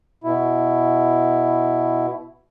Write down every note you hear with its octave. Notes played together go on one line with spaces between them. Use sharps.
B2 E4